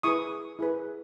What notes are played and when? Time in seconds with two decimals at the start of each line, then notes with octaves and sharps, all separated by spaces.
0.03 E4 G#4 B4 C#6 D#6
0.59 E4 G#4 B4